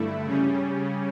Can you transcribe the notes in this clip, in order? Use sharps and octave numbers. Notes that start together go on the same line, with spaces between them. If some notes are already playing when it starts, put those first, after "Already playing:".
Already playing: G2 D3 A3 E4
C#3 G3 C#4